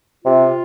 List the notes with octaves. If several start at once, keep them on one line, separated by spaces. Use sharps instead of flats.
C3 F4